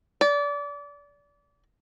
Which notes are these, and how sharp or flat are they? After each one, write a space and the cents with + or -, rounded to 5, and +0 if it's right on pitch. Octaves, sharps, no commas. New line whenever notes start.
D5 -30